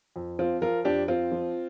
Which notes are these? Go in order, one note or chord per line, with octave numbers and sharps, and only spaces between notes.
F2
F3 C4 F4
F3 F4 A#4
F2 D4 G4
F2 C4 F4
F3